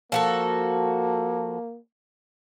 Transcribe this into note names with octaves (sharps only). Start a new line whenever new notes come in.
F3 A#3 F#4 A4